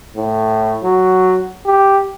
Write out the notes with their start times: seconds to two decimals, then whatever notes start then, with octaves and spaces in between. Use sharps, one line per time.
0.17 A2
0.84 F#3
1.66 G4